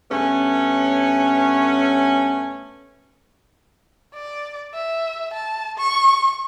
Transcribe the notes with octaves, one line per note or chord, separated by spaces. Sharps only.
G2 A3 B3 C#4
D5
E5
A5
C#6